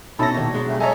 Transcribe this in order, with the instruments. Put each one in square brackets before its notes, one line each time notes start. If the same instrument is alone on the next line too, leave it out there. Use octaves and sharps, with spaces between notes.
[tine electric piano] B2 A#6 [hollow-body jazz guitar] C#4 D#4 B5 [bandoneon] E4 A4 A5
[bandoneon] E2 C#5 [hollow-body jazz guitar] A#2 D#3
[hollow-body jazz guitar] F#3 G#3 D4
[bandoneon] C#3 G3 A3
[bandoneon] A4 A#5 [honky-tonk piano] C#5 D#5 G#5 [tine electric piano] E5